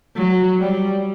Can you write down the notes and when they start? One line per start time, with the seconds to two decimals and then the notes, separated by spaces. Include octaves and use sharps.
0.16 F#3
0.59 G3